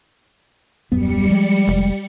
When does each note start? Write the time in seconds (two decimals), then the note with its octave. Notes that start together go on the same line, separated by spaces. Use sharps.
0.92 D#1 F#2 G3 B3 C#7
1.29 F3 G#3
1.68 F1